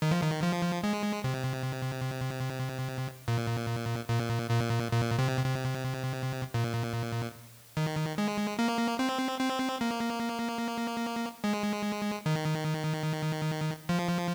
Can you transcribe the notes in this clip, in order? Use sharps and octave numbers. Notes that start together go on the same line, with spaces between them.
D#3
F3
D#3
F3
G#3
C3
A#2
A#2
A#2
A#2
C3
C3
A#2
D#3
G#3
A#3
C4
C4
A#3
G#3
D#3
F3